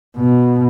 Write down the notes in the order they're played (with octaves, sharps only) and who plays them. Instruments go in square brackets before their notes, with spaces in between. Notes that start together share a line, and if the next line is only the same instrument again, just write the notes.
[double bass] B2